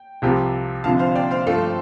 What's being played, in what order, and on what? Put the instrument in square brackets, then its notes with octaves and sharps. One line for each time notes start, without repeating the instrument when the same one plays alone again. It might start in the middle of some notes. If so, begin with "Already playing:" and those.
Already playing: [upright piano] G5
[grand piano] C2 C3 F3 C4 G4
[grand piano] F1 F2 D3 F3 [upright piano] F5 A5
[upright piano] C5 F5
D5 G5
C5 F5
[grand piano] G2 F3 A3 F4 [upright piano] A4